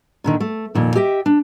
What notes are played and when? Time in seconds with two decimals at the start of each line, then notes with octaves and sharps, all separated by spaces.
0.24 A#2 D3 D#3
0.40 A3
0.75 F2 A#2 D#3
0.95 G4 D#5 E5 G5
1.26 D4